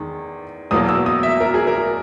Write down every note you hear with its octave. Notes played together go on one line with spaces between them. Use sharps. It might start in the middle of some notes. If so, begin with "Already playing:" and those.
Already playing: E2 D#3 G#3
E2 B2 F#3 A#3 D#6
E6
D#6
E5
A#4
G#4
A#4